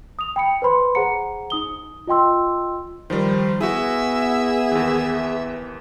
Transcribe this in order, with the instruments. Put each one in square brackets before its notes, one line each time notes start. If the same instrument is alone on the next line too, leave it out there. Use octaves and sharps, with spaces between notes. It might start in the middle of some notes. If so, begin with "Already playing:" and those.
[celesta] D#6 F7
G5 B5 C#7
B4 C5 B5 C6
G#4 C5 F#5 A#5 C#7
D#4 D#6 G7
F4 D#5 G5 C6 E6
[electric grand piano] D#3 F3 G3 [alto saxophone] C5
[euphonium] B3 [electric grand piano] E4 F#4 [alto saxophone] G#4 [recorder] E5
[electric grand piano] D#2 E3